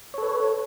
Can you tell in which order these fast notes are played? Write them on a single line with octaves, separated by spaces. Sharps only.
C#5 A4 B4